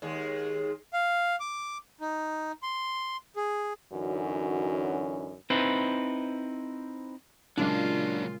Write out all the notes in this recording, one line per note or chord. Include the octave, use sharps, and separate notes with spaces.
D#2 G#3
F5
D6
D#4
C6
G#4
F#2 D3 E3 C#4 D#4 F#4
C4 D#4 E4 B4 C5
A#2 C#3 F#3 G#3 A#3 D4 F4